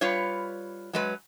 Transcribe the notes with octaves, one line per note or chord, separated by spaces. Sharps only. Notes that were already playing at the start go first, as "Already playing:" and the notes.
G3 F4 B4 C#5
F#3 G#3 B4